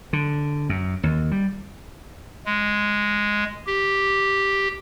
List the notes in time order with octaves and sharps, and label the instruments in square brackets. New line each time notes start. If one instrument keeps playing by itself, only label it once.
[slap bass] D3
F#2
D#2
G3
[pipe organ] G#3
G4